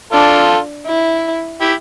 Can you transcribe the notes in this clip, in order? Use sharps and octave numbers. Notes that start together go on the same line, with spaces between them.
D4 F4 A4
E4
E4 G4